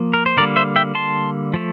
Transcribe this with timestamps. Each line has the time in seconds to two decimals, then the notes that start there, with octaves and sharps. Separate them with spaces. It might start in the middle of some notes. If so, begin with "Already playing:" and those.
Already playing: F3 A#3
0.14 A#4
0.26 C5
0.37 D3 G3 A#3 A#4 D5
0.56 C5 E5
0.76 E5 G5
0.95 A5 C6
1.54 F3 A3